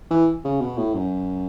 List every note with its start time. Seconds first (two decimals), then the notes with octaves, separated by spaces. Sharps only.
0.11 E3
0.45 C#3
0.61 B2
0.78 A2
0.94 F#2